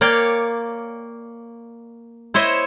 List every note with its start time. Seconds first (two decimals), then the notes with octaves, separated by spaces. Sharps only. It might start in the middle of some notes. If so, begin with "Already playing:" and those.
0.01 A#3 C#5 D5 F5 G5
2.34 E4 C5 C#5 D#5 E5